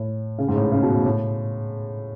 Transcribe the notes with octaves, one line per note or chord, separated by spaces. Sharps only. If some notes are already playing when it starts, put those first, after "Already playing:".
Already playing: A2
C#3
G#2
A2
C#3
B2
A2
A2